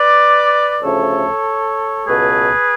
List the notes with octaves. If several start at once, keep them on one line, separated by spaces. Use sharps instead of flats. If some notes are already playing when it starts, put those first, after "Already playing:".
Already playing: B4 D5
D2 C#3 F3 A3 A4 C#5
C#2 B2 A3 G#4 B4